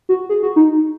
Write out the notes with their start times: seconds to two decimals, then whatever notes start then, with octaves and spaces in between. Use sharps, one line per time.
0.09 F#4
0.29 G#4
0.43 F#4
0.56 D#4